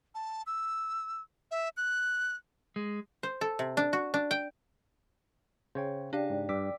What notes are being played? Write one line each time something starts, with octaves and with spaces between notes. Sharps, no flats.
A5
E6
E5
F#6
G#3
C5
A4
C3
D4
F#4
D4
G5
C#3 C5 C#5 G5
D4 G4 D5 F5 G5
G#2
G2 D6 E6 B6